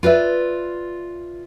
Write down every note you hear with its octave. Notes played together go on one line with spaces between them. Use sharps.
F4 B4 D5 E5